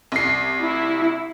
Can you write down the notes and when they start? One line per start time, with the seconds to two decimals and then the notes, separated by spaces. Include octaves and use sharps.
0.12 C2 C7
0.61 E4